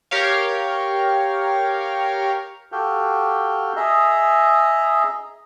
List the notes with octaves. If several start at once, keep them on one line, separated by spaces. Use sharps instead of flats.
G4 A#4 C#5 F5
F#4 G4 A4 F5 G5
G#4 D#5 E5 A#5